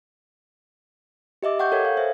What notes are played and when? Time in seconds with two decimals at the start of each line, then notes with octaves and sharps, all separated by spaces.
1.43 G4 D#5 E5 D6
1.59 F#5 G5 C#6 G6
1.72 A4 A#4 C#5 G5 G#6
1.85 F5
1.97 C5 E5